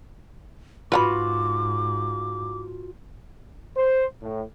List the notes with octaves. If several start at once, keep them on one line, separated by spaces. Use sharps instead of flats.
G#2 F4 F#4 B4 F#5 B5 D6
C5
A2